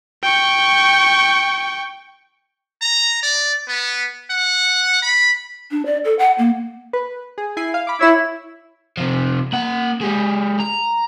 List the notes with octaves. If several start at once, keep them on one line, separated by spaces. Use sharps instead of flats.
G5 C#6
A#5
D5
B3
F#5
B5
D4
D5
A4
F#5
A#3
B4
G#4
E4 G#5 C7
F5
B5 D6
E4 C#5 E6
C3 F3
A#3 F#5
G#3 G4
A#5